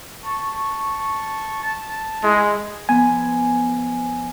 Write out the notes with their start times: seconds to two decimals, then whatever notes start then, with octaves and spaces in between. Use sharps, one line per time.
0.23 A5 C#6
1.62 A5
2.23 G#3 E4
2.89 F3 B3 G#5